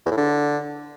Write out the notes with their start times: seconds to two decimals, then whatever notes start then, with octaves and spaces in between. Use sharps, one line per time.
0.06 E2
0.11 A2
0.17 D3